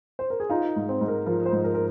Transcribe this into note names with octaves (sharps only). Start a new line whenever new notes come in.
C5
A#4
G#4
D#4 F4
G#2
C4
G#2
A#4
F3 A#4
C5
G#2
A#4
A#4